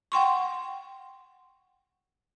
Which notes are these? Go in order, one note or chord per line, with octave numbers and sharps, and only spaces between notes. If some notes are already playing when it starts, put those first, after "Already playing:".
F#5 G5 C6 C#6